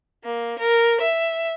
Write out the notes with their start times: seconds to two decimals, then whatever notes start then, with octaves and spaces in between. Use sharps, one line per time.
0.24 A#3
0.59 A#4
1.01 E5